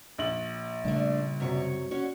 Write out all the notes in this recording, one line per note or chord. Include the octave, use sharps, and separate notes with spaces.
A#1 F#7
C#3 G3 A3 D4
F#2 C3 C#5
C#4 F#4 C#5